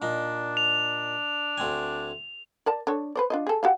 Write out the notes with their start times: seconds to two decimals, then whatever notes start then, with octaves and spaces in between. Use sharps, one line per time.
0.02 A#2 D4 D#4
0.57 F7
1.58 D2 C4 G#5
2.66 A#4 D5 A5
2.87 D4 A4 C#5
3.15 B4 C5 D5
3.30 D4 F4 D#5
3.47 G#4 A4
3.63 F#4 G4 F5